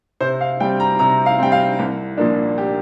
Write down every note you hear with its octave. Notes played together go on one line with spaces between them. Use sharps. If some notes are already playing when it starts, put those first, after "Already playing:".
C3 C5
F5
G3 C4 G5
A#5
C3 A#5
F5
G3 C4 G5
F5
C2
A#2 F3 A#3 D4
G4